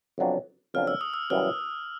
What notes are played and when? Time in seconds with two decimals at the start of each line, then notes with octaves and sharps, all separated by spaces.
0.18 F2 C#3 F#3 B3 D4
0.74 F2 C#3 F#3 B3 D4 F6
0.87 E6
1.01 D#6
1.14 E6
1.30 F#2 C#3 E3 G3 B3 F6